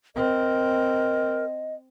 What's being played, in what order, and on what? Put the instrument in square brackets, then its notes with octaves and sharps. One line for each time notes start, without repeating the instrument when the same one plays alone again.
[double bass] C4 [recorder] A#4 [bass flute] D#5